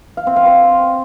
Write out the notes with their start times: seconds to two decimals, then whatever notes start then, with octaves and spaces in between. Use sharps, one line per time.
0.17 F5
0.27 C4
0.36 F5
0.46 C5